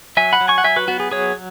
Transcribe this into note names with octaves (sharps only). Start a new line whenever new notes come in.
F#3 E5 G#5
F#5 B5
F#3
G#5 C#6
F#5
F#3 E5 G#5
F#4 B4
B3 F#4
G#4
F#3 G#4 C#5